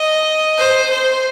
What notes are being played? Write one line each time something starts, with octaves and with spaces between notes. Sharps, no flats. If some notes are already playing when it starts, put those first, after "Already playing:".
Already playing: D#5
C5
C5